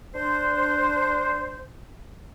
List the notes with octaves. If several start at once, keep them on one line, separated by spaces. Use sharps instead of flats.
D4 C5